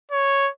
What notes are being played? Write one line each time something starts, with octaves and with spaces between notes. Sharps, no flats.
C#5